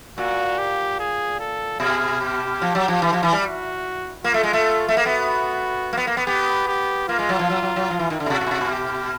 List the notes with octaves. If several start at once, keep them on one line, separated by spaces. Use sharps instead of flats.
A#2 F#4
G4
G#4
A4
B2 G#4
G4
F3
F#3
F3
E3
F3
E3
G3
F#4
A#3 F4
A3
G#3
A3
A3
A#3
B3 F#4
A#3
B3
A#3
B3
B3 G4
G4
A#3 F4
G#3
F#3
F3
F#3
F#3
F#3
F3
E3
D#3
D3
B2
C3 F#4
C3
B2
C3
B2
G4